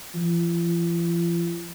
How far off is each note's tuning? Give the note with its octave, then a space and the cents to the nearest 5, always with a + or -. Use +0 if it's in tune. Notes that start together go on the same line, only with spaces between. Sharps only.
F3 -45